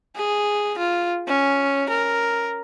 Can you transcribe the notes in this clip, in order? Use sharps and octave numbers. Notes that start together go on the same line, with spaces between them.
G#4
F4
C#4
A#4